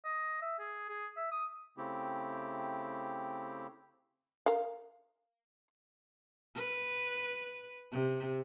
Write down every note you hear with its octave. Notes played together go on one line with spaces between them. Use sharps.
D#5
E5
G#4
G#4
E5
D#6
C#3 A3 C4 E4 G4
A#4 F5
B4
C3